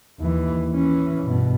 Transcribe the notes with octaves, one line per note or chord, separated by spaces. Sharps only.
D#2 E3
E3 C#4
G2 B2